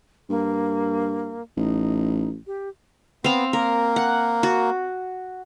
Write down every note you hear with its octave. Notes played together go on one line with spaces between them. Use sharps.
G2 A#3
A1 D#4
G4
B3 C4 F5
A#3 A#4
F#5
F#4